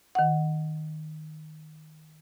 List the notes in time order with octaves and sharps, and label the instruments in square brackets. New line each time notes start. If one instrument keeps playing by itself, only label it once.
[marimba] D#3 F#5